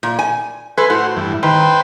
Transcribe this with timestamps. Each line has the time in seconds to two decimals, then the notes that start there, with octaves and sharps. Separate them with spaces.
0.03 A#2
0.19 G#5
0.78 A4 B4 G#5 C6
0.90 A2 F#4 C5
1.17 G2 E3
1.43 D#3 B4 C5 G5